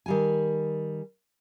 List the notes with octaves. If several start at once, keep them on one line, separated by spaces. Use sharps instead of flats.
D#3 G3 G#5